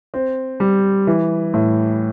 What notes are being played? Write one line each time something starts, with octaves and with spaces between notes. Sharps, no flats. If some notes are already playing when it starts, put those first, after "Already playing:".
C4
G3
E3
A2